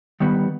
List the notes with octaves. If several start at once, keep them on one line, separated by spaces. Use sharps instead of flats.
D#3 G3 B3